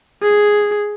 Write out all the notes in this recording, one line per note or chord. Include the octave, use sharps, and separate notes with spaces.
G#4